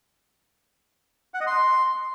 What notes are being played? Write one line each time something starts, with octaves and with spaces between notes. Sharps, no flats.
F#5
D#5
C6